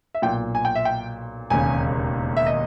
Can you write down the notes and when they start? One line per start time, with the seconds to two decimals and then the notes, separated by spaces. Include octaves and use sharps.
0.15 E5
0.22 B1 A#2 G5
0.55 G#5
0.65 G5
0.75 E5
0.85 G5
1.50 E1 D#2 C#3 G#5
2.37 E5
2.47 D#5